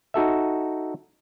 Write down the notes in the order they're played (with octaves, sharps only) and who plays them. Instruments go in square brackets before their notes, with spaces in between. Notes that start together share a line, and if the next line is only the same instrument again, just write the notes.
[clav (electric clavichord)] D#4 F#4 A4 E5